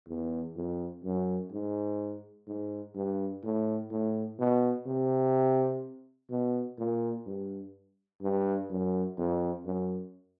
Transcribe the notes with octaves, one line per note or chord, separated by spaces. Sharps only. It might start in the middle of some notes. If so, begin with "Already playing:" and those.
E2
F2
F#2
G#2
G#2
G2
A2
A2
B2
C3
B2
A#2
G2
G2
F#2
F2
F#2